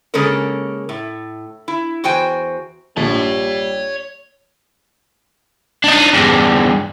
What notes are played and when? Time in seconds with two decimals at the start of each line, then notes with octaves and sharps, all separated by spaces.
0.14 C#3 G#3 A#3 C#4 A4 A#4
0.89 A2
1.68 E4
2.04 E2 F#4 C5 G5 G#5
2.97 A#1 G3 C#5 A5
5.84 D4 D#4
6.14 E2 G2